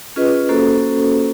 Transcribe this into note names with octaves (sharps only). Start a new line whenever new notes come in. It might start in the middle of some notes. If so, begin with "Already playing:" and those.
C#4 F4 G#4 B4 D#5
A#3 C#4 F#4 A4 C5